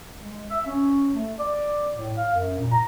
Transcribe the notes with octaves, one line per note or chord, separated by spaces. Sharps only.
G#3
E5
C#4
A3
D5
A2
F5
F#2
A#2
A#5